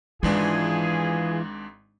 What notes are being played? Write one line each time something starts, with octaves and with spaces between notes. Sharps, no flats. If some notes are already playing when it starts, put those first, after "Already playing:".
G#1 G#2 E3 G#3 D4 F4 G#4